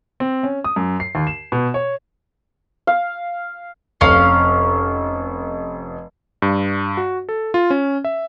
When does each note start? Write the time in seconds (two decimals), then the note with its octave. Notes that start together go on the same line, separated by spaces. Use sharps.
0.20 C4
0.43 C#4
0.64 D#6
0.76 F#2
1.00 C7
1.15 D#2
1.27 E7
1.52 B2
1.74 C#5
2.87 F5
4.01 F1 C#4 F5
6.42 G2
6.97 F#4
7.29 A4
7.54 F4
7.70 C#4
8.05 E5